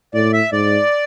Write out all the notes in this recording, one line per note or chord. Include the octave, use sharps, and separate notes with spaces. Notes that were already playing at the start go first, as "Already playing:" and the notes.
A2 D5
E5
G#2 D5